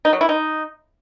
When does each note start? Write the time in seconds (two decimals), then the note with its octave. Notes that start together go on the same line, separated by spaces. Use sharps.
0.05 D#4
0.13 F#3
0.21 E4
0.29 D#4